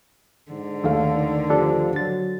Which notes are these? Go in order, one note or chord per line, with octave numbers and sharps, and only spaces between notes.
G#2 D3
D#2 A3 F5
D#3
F3 D4 G4 A4
F#3 A6